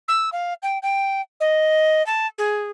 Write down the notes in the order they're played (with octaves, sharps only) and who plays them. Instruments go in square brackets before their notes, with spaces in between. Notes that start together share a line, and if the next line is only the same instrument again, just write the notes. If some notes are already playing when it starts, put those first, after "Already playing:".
[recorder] E6
F5
G5
G5
D#5
A5
G#4